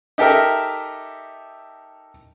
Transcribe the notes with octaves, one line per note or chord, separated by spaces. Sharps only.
D#4 G4 A4 A#4 E5